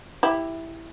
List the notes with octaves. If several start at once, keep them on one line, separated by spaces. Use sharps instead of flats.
E4 G4